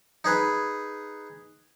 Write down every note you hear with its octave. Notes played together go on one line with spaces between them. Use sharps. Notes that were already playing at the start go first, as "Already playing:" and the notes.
D#4 G#4 B4